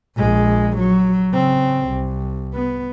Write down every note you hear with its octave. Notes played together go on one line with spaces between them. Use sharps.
A#1 G#3
F#3
C#3 C4
C2
B3